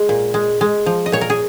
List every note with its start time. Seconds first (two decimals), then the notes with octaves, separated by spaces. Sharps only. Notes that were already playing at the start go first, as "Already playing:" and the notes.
Already playing: G#3
0.09 A#2
0.34 G#3
0.61 G#3
0.86 F3
1.06 D#5
1.12 A#2 C#5
1.21 A#4
1.30 G#4